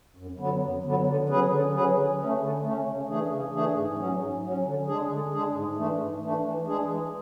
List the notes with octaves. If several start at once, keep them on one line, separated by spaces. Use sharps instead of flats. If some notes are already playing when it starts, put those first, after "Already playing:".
F#2
D3 F#3 B3
F#2
D3 F#3 B3
D3
F#3 C#4 G#4 B4
D3
F#3 C#4 G#4 B4
D3
A3 C#4
D3
A3 C#4
C#3
E3 A3 D4 G#4
C#3
E3 A3 D4 G#4
G#2
F#3 C#4
G#2
F#3 C#4
D3
G#3 D4 G#4
D3
G#3 D4 G#4
G#2
E3 A3 D4
G#2
E3 A3 D4
E3
G#3 D4 G#4
E3